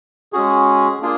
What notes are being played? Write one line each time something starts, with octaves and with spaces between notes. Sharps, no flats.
G#3 C#4 F#4 G#4
A#3 D4 F4 G#4